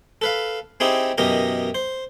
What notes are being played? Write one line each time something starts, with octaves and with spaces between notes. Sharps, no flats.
A4 B4 F5
C4 D#4 E4 G4 G#4
F#2 B2 E3 G4 A#4 D#5
C5